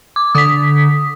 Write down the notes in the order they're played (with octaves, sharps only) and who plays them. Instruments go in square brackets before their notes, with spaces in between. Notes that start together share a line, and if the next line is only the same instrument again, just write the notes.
[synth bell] D6
[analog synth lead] D3 [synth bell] D#6 B6